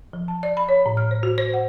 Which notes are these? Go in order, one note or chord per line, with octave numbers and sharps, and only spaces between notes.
F3
A5
D5
B5
C#5
A2
F6
C5
F#4
C5
F#5